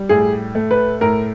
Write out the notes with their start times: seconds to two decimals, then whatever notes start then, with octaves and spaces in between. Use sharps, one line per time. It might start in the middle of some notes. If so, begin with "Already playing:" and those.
Already playing: G3
0.09 A2 G#4
0.55 A3
0.71 B4
1.01 A2 A#4